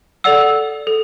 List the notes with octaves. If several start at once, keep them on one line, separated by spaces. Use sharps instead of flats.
A4 D5 F#5 E6
A4